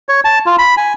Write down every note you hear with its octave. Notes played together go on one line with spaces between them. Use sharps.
C#5
A5
F4
B5
G#5